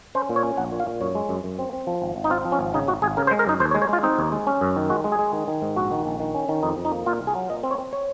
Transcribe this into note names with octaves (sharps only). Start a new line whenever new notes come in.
C#4 C5
A#2
C#5
C#4
A#1 F#5
A#2
F5
A#2
F#2 C#5
G#3
F#2
F#2
C4
C4
F3
G#1
G#1
D#4
C4 F4
F3
C#4
G#1
C#3 D#4
G#1 F#4
G#1 G#4
C#3 A#4
C5
G#3
A#4
F#2 D#4
D#2 C5
C#5
G#3
C#5
G#3 F4
C4 D#4
D#2
G#3
C#4
F#2
D#3
G#3 F#4
G#3
G#4
G#3
D#3
D#3
G#2
A#1 F#4
D#3
A#1
D#3
C#4
D#3
F2 D#4
F2
D#4
A#3
A#2 F4
C2
G#4
F#3
A#2 D#5
C4
C#5
C4
C#5